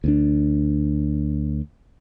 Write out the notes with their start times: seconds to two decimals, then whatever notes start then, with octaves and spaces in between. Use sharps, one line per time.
0.04 D2 C#4 D4